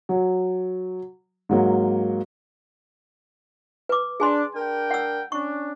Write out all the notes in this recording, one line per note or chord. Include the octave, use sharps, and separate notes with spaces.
F#3
G#2 F#3 A#3
B4 D6
D4 G#4 G#5 C6
D4 A#4 G5
F#5 E6
C#4 D4 C#6